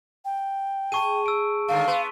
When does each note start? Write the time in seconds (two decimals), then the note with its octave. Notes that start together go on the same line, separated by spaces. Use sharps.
0.25 G5
0.92 G#4 A5 C#6 D#7
1.26 E6 D7
1.68 G2 D3 D#3 F5
1.88 B3 C6